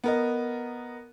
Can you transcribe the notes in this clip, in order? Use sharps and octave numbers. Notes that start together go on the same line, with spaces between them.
B3 A#4 D#5